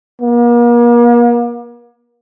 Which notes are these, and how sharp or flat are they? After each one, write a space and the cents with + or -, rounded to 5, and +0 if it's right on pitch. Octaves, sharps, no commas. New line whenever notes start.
A#3 +40